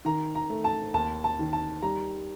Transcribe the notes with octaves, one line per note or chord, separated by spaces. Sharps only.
D#3 A#5
A#5
A3
A5
D#2 A5
A5
D#3
A5
G3 A#5